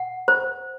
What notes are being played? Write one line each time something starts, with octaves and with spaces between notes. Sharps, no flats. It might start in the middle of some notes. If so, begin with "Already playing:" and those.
Already playing: F#5
C5